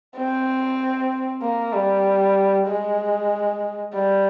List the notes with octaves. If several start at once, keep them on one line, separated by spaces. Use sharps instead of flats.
C4
A#3
G3
G#3
G3